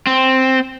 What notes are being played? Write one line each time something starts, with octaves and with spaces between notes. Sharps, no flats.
C4